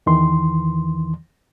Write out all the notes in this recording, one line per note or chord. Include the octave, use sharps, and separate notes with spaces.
E2 D#3 E3 C6